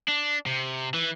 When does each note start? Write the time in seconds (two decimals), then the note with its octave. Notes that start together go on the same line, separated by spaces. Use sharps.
0.08 D4
0.46 C3
0.94 E3